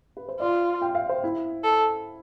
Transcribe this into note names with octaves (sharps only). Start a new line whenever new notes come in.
B4
C5
F4 D5
G5
F5
C5
E4
A4